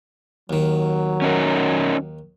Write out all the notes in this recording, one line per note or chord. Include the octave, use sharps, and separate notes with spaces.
D#2 D#3 F#3
C#4 D#4 A#4